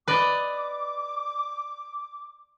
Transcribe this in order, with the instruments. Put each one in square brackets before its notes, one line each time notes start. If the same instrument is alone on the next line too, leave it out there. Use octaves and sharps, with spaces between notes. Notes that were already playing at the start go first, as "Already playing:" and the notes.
[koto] B4 D5 D#5 [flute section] D6